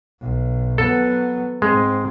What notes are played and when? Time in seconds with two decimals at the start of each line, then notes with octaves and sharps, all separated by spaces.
0.21 B1
0.78 F#3 B3 A4
1.62 G#2 G#3 C4